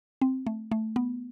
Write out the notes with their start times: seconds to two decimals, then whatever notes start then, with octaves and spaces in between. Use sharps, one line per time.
0.22 C4
0.47 A3
0.72 A3
0.96 B3